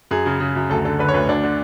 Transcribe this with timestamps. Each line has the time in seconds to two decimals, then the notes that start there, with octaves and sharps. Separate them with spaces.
0.11 F#2 G#4
0.26 C#3
0.40 C#3
0.56 F#2
0.70 D2 A4
0.85 D3 A4
0.99 D3 B4
1.08 C#5
1.14 D2 B4
1.28 D2 D4
1.43 D3